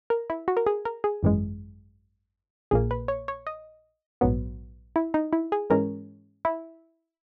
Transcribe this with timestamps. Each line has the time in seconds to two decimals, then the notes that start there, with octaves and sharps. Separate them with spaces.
0.10 A#4
0.30 E4
0.48 F#4
0.57 A#4
0.66 G#4
0.85 A#4
1.04 G#4
1.23 G#1 F#2 E3 G#3
2.71 A#1 A#2 A#3 G#4
2.91 B4
3.08 C#5
3.28 C#5
3.47 D#5
4.21 A#1 G#2 F#3 B3
4.96 E4
5.14 D#4
5.33 E4
5.52 G#4
5.70 G#2 E3 G#3 C#4 A#4
6.45 E4